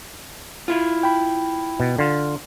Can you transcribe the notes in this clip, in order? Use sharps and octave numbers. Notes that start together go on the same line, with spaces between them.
E4 F4
G5 B5
B2
D3 F4